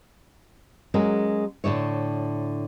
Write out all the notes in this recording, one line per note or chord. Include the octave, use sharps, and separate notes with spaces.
F#3 G#3 C#4 F#4 A#4
A2 D3 E4 C#5